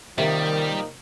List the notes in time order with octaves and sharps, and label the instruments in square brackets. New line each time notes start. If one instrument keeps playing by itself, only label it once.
[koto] C3 [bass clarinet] D#3 [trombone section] F3 A#3 D#4 [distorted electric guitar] G3